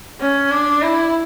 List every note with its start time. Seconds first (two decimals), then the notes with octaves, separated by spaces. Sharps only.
0.20 C#4
0.51 D4
0.82 E4